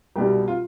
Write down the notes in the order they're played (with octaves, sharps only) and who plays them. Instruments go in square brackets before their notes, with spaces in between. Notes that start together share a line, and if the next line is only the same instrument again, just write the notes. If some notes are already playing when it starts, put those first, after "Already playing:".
[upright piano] C2 B2 G3 G4
F4